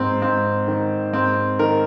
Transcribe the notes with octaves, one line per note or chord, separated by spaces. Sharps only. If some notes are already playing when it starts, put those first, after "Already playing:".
Already playing: G#2 D#3 C4
G#2 C4
D#3
G#2 C4
D#3 A#4